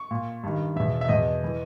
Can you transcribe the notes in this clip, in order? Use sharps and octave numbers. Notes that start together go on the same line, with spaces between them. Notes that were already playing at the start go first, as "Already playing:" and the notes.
Already playing: C#6
A#2
G2 D#3
E2 B2 E5
E5
E2 B2 D#5
E3